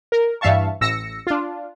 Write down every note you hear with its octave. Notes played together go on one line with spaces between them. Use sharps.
A#4
G2 E3 E5 F5 A5 C#6
A1 E6 A#6 C#7
D4 F4